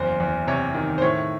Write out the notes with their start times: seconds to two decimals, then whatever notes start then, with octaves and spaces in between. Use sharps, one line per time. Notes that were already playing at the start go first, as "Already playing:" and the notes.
Already playing: F#1 E2 C5
0.20 E2
0.47 C3 C#5
0.74 D#3
0.98 C5
1.02 A2 C#5